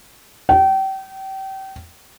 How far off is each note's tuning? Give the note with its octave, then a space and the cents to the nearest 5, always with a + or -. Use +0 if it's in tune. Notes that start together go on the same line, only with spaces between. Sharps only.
G5 -30